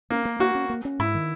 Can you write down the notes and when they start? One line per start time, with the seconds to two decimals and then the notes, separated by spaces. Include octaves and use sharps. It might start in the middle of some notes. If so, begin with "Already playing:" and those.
0.10 A#3 C#4
0.25 A#3
0.39 A#3 F#4
0.55 C#4
0.69 A#3
0.85 C#4
0.99 G#2 E4
1.15 D#3